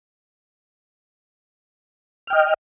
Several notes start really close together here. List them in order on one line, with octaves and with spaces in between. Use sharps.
F6 G5 D#5